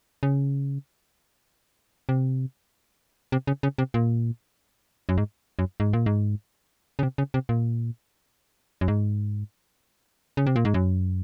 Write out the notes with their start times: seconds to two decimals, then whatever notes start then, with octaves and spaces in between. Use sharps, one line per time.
0.23 C#3
2.09 C3
3.32 C3
3.47 C#3
3.63 C#3
3.78 C3
3.94 A#2
5.09 F#2
5.18 G#2
5.59 F#2
5.80 G#2
5.93 A#2
6.06 G#2
6.99 C#3
7.03 C3
7.18 C#3
7.34 C3
7.49 A#2
8.81 F#2
8.88 G#2
10.37 C#3
10.47 C3
10.56 A#2
10.65 G#2
10.74 F#2